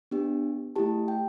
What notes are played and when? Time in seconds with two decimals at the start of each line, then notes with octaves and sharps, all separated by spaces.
0.11 B3 D4 G4
0.76 A3 E4 G4 A5
1.08 G5